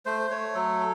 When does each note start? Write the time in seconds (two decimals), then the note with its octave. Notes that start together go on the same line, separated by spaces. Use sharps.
0.06 A3 C5
0.30 A3 C#5
0.55 F#3 A4